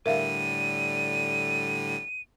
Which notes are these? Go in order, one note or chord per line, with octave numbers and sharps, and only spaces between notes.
A2 D3 G3 A#4 E5 F5 D#7